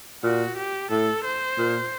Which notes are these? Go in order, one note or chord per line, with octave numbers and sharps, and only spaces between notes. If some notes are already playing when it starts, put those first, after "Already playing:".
A#2 F#4
G4
A2 A4
C5
A#2